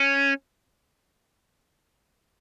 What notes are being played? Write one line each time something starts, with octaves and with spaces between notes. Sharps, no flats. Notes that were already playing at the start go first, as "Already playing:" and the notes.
Already playing: C#4